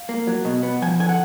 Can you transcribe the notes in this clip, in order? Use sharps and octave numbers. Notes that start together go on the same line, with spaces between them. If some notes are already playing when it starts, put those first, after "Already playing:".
Already playing: F5
A#3
F#3
B2
B3
F3 G#5
D3 G#5
F#5